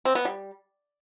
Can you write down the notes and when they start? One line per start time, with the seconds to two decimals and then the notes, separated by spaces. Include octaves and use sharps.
0.05 C4
0.15 B3
0.25 G3